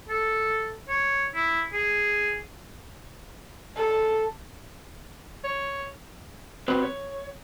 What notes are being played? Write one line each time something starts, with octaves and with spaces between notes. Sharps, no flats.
A4
C#5
E4
G#4
A4
C#5
C4 F#4 G4 B4 C5
C#5